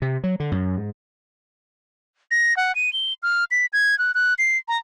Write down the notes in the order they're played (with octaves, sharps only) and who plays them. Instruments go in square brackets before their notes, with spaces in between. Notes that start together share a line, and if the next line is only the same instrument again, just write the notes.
[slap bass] C3
F#3
D3
F#2
G#2
[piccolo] A#6
F#5
D#7
G7
F6
B6
G#6
F#6
F#6
C7
A#5